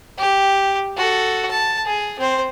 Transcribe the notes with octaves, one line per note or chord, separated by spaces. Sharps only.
G4
F#4 A4
A5
G#4
C4 C5